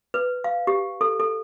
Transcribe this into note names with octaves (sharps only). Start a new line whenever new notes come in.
B4
F5
G4
A4
A4